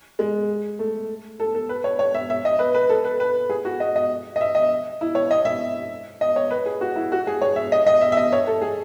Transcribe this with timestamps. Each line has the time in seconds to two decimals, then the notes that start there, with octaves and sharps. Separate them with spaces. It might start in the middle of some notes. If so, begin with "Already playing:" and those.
0.19 G#3
0.79 A3
1.40 A4
1.55 A4
1.69 B4
1.84 C#5
1.99 C#5
2.14 E5
2.30 E5
2.45 D#5
2.59 B4
2.74 B4
2.89 A4
3.04 B4
3.20 B4
3.50 G#4
3.65 F#4
3.80 D#5
3.96 D#5
4.36 D#5
4.41 E5
4.55 D#5
5.01 E4
5.15 C#5
5.31 D#5
5.45 E5
6.21 D#5
6.36 C#5
6.51 B4
6.66 G#4
6.81 F#4
6.96 E4
7.12 F#4
7.27 G#4
7.42 C#5
7.56 E5
7.72 D#5
7.87 D#5
8.01 E5
8.12 E5
8.17 D#5
8.33 C#5
8.47 A4
8.61 G#4